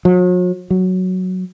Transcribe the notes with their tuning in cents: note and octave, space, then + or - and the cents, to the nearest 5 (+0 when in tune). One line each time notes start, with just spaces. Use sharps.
F#3 -45
F#3 +0